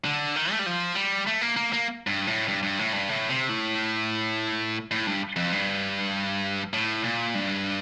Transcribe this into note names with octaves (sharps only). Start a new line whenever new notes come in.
D3
D#3
A3
G3
F3
G3
A3
A#3
A#3
A#3
G2
A2
G2
G2
A2
G2
A2
C3
A2
A2
G2
F2
G2
A2
A#2
G2